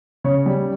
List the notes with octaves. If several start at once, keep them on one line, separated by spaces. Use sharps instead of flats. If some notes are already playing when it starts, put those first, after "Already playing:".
C#3 C#5
G3